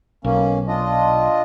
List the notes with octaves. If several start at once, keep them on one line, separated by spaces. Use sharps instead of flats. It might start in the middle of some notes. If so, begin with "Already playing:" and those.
B1 A#3 C#4
D4 F4 D#5